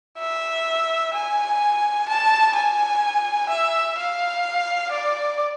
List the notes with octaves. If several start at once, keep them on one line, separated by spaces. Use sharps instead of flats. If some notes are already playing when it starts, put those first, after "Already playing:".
E5
G#5
A5
G#5
E5
F5
D5